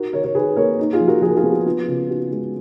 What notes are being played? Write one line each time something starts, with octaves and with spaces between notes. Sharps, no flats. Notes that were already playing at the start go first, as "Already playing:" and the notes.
Already playing: D#4 F#4 A#4
D#3 A#4 C#5
A#4 C#5
D#3 G#4 B4
A#3 A#4 C#5
D#4
F4 G#4
F3
F#4 A#4
F3 F4 G#4
A#4
F4 G#4
B3
F#4
B3 F4
C#3 F4
D#4 F#4
G#3 F4